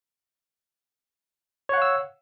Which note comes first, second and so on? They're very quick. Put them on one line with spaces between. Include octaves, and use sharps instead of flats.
C#5 F#5 F5 E6